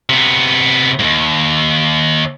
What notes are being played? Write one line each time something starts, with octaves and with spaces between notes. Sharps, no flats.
C3 B3
D#2 G#2